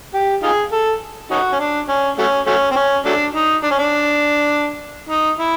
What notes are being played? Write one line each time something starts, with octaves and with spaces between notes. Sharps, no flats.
G4
D#4 F4 G#4
A4
C#4 D#4 F#4
C#4
D4
C#4
F#3 A3 C#4
F#3 A3 C#4
C4
C#4
F#3 A3 D4
D#4
D4
C#4
D4
D#4
E4